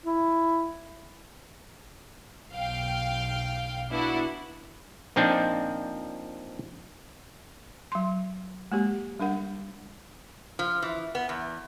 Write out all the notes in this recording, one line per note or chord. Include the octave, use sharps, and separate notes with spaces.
E4
B1 F5 G5
B3 D4 E4 F#4
A#2 F3 C4 D4 D#4
F#3 C6
G#3 A#3 G4
G3 D4 A#4 F#5
F3
E3
B3
E2